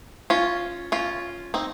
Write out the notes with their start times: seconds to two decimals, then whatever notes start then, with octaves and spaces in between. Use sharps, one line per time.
0.30 C#4 F4
0.92 C#4 F4
1.54 C4 D#4